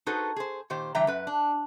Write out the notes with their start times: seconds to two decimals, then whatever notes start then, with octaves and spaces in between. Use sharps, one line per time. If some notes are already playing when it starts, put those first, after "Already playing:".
0.06 D#4 F#4 G#4 A4 B4 C5
0.36 G#4 C5
0.70 A#2 D#3 G4 C5
0.95 D3 E3 G3 E5 G5 A#5
1.07 F#2 B4
1.27 D4